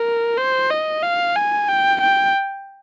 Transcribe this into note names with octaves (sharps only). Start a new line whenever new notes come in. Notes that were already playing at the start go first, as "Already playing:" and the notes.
Already playing: A#4
C5
D#5
F5
G#5
G5
G5